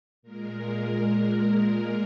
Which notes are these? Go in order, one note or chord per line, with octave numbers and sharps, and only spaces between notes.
A#2 G#3 A#4
A#4